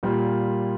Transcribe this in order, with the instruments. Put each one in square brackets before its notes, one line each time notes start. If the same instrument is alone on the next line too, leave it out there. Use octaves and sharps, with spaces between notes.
[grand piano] A#2 G3 A#3 F4